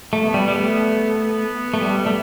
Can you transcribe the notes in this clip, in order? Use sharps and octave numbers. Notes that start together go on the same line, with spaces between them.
A3
B3
G3
G3
A3
B3
A3
G3
A3